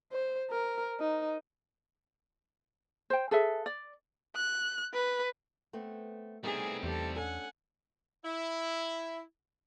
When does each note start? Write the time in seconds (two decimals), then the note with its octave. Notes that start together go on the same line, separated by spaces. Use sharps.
0.12 C5
0.51 A#4
0.99 D#4
3.10 C5 G5
3.31 G#4 A4 B4 E5
3.66 D5
4.36 F#6
4.94 B4
5.73 A3 B3 C4
6.43 G3 A3 B3 C4 D#4 G#4 G#5
6.83 E2 G4 A4
7.16 C#4 D4 A4 F#5 G#5
8.25 E4